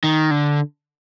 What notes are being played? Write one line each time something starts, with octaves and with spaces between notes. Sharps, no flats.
D#3
D3